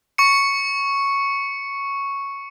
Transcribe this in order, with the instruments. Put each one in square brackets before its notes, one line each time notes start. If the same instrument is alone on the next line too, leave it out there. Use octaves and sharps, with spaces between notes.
[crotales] C#6 C#7